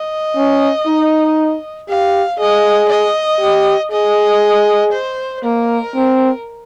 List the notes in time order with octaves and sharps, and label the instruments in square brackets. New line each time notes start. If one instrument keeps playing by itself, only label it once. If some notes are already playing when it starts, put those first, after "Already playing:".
Already playing: [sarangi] D#5
[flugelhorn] C#4
D#4
[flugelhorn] G4 [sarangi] F5
[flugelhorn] G#4 [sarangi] D#5
[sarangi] D#5
[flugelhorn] G4
[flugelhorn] G#4 [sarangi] D#5
[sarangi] C5
[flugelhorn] A#3 [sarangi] A#4
[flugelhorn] C4